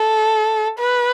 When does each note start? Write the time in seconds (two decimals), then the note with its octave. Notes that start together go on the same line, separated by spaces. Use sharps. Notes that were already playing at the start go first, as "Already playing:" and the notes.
Already playing: A4
0.79 B4